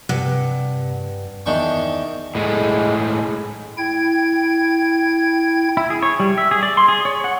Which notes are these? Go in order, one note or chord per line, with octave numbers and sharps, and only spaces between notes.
G2 C3 F#5
E2 D#3 D4 G5 C#6
A2 G#3
E4 G5 G#6
E4
G#4
C#5
G3
E5
G#4
D5
C6
G#4
C#5
F#5